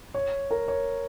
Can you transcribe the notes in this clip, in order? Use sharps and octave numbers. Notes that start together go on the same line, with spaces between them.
C#5
A#4
C#5